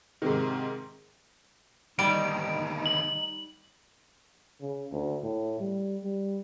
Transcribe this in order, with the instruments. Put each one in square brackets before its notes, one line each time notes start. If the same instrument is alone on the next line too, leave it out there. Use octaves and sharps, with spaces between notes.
[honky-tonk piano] G#2 C3 D#3
[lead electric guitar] D2 D#3 [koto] G3 [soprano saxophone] D#4 [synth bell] D7
[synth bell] F#7
[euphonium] C#3
D2
A2
G3
G3